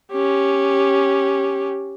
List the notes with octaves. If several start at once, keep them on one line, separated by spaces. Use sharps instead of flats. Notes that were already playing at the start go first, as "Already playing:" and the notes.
C#4 G4